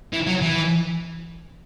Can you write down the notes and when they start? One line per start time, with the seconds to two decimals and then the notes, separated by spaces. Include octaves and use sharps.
0.13 E3
0.27 F#3
0.42 E3